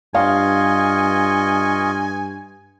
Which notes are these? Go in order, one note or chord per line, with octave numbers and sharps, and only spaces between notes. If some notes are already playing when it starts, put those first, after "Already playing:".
G2 F4 D#5 F5 G#5 C#6